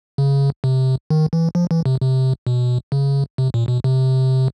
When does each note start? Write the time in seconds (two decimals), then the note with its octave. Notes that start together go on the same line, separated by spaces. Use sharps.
0.18 C#3
0.64 C3
1.10 D#3
1.33 E3
1.55 F3
1.71 E3
1.86 C3
2.01 C3
2.47 B2
2.92 C#3
3.38 C3
3.54 A#2
3.68 B2
3.84 C3